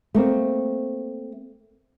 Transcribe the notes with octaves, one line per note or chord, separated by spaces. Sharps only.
A3 A#3 C4